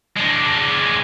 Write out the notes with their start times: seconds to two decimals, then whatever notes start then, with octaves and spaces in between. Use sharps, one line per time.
0.17 G#3 D4